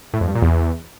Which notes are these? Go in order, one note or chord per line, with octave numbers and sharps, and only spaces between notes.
A2
F2
G2
A#2
E2